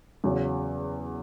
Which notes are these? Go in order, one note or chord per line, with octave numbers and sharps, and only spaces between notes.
E2 C#3 F#3